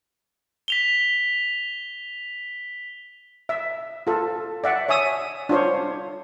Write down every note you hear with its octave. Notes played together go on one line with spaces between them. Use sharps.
B6 F7 G7
E5
F4 A4
D5 E5 F#5
C#5 E5 G#5 D#6 E6
D4 F4 C5 C#5